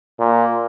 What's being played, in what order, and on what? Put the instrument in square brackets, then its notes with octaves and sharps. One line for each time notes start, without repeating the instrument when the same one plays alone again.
[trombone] A#2